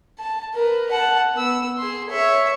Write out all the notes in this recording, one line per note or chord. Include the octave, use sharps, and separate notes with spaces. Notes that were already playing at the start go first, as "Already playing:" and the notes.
A5
A#4 B4
F#5 A5
B3 E6
G#4 C6
C#5 E5